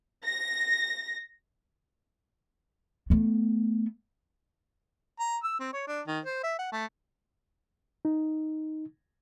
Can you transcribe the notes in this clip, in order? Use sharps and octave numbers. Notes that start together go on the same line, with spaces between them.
A#6
A3 B3
A#5
E6
C4
C#5
D4
D#3
C5
E5
F#5
A3
D#4